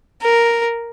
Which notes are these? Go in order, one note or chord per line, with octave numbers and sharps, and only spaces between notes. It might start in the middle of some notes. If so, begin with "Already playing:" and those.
A#4